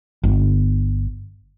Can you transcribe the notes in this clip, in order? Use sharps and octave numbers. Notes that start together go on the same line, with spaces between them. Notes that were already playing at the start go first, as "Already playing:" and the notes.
G1